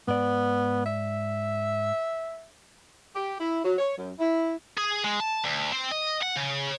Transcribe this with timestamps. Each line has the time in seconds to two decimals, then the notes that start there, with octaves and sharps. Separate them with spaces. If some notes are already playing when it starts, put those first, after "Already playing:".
0.08 G#2 B3 D5
0.86 E5
3.15 G4
3.39 E4
3.64 F#3
3.78 C#5
3.97 F#2
4.19 E4
4.77 G#4
5.04 G#3
5.20 A5
5.45 D2
5.73 C4
5.92 D#5
6.23 F#5
6.37 C#3